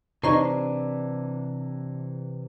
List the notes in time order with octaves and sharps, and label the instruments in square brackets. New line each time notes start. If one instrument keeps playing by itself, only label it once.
[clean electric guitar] C3 E3 [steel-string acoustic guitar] D4 [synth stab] D#4 C#5 C7 [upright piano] C5 A#5